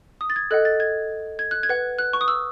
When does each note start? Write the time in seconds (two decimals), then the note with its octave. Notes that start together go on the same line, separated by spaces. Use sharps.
0.21 D#6
0.30 A6
0.36 G#6
0.51 A4 D#5 F#5 F#6
0.65 A6
0.80 G#6
1.39 G#6
1.51 F#6
1.63 G#6
1.69 B4 F#5
1.99 F#6
2.13 C#6
2.21 D#6
2.28 E6